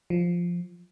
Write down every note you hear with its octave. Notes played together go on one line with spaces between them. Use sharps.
F3